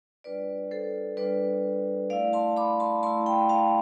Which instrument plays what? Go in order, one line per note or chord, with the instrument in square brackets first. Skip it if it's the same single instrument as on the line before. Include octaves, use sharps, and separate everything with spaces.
[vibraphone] G3 D4 F4 B4 D5
A4 C5
G3 D4 F4 B4 D5
A3 E4 D5 F5
A5 C6
B5 D6
A5 C6
A3 E4 A5 C6
G5 B5
F5 A5